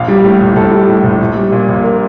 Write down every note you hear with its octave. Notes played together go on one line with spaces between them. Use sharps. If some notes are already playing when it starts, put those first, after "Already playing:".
Already playing: A#1 F5
G3
A2
A#1
A#1 A4
G3
A2
A#1
A#1
G3
A#2
A#1
A#4